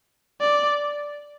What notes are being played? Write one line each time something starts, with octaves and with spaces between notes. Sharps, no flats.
D5